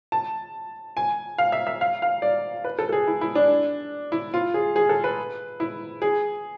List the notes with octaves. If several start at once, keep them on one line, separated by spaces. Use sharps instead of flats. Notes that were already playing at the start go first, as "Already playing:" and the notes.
A5
G#5
F5
E5
E5
F5
F5
D5
B4
A4
A4
G#4
E4
E4
D4
E4
F4
G#4
G#4
A4
B4
E4
G#4